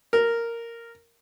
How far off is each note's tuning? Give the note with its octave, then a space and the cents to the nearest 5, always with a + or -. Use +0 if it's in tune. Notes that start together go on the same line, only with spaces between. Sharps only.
A#4 -5